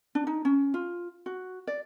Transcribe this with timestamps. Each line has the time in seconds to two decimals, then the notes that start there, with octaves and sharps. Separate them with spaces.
0.15 D4
0.27 D#4
0.45 C#4
0.74 F4
1.26 F#4
1.67 D5